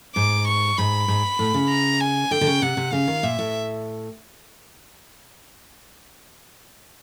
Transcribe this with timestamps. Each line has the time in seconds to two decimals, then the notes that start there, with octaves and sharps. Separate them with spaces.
0.16 G#2 D6
0.48 C#6
0.78 G#2 B5
1.08 G#2
1.39 A2
1.54 C#3
1.69 A#5
2.00 G#5
2.31 D3 G5
2.41 D3
2.47 C#3
2.62 C3 F#5
2.77 C3
2.93 C#3 F5
3.08 D#3
3.23 A#2 E5
3.39 A2